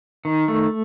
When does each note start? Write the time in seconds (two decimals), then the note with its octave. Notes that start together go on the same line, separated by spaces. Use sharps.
0.25 D#3
0.48 A3